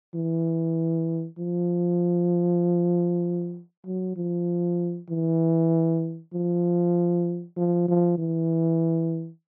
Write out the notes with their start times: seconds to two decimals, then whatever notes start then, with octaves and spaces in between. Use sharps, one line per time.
0.15 E3
1.39 F3
3.86 F#3
4.16 F3
5.10 E3
6.34 F3
7.57 F3
7.88 F3
8.18 E3